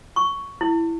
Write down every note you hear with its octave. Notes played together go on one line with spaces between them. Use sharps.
C#6
E4